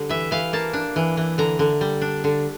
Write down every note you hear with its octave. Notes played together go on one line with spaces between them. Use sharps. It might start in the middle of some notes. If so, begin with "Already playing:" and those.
Already playing: D3 G3
E3 E5
E3 F5
A#3 A5
D4
E3
E3
D3 A#5
D3
G3
D4
D3